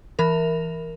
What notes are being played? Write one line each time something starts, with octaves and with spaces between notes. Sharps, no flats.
E3 A#4